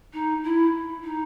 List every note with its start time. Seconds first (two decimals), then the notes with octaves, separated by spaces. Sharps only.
0.13 D#4
0.44 E4
1.04 D#4